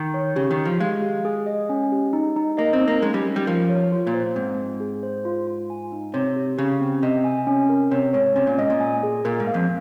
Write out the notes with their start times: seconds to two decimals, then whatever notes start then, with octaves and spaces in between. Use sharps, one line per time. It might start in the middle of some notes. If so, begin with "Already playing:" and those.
Already playing: D#3
0.14 C#5
0.36 C#3 G4
0.51 D#3
0.57 G4
0.65 F3
0.80 G#3 F5
1.02 G4
1.25 G#4
1.46 D#5
1.70 C#4
1.92 G4
2.13 D#4
2.36 D#4
2.58 A#3 D#5
2.73 C4
2.81 D#4
2.88 A#3
3.02 G#3 C#4
3.14 G3
3.25 C#4
3.36 G3
3.47 F3 A#4
3.69 C#5
3.92 F4
4.07 A#2
4.14 C5
4.36 G#2 C4
4.59 C4
4.80 G#4
5.03 C5
5.25 F4
5.47 F4
5.70 G#5
5.92 D#4
6.14 C3 C#5
6.36 G4
6.58 C#3 G4
6.81 C4
7.03 C3 D#5
7.24 G#5
7.47 C#4
7.69 A#4
7.91 C3 C#5
8.13 G#2 C#5
8.35 C3 C#4
8.47 A#2
8.58 G#2 D#5
8.70 A#2
8.80 G#5
9.03 G#4
9.25 A#2 A#4
9.40 G#2
9.47 F5
9.54 F2